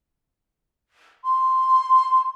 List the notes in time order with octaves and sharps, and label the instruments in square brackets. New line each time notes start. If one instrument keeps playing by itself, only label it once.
[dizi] C6